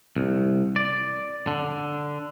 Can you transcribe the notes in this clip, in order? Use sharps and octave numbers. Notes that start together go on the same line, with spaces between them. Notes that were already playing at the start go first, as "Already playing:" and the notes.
C2
D5
D3